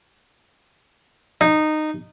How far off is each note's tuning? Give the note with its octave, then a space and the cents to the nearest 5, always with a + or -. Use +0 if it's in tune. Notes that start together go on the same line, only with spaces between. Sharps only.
D#4 -15